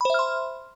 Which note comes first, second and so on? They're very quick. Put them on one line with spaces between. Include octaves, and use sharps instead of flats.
B5 C5 E5 F6 C6